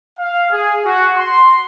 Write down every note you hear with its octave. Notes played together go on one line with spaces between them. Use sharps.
F5
G#4
F#4
C6